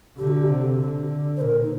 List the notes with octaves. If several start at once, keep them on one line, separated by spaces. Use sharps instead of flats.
D3 G4
F#4
G4
C3
D3
C5
A#2 A#4
D#4